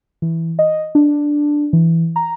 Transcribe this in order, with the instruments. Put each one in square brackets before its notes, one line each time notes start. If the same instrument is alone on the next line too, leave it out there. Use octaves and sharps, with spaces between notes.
[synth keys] E3
D#5
D4
E3
A#5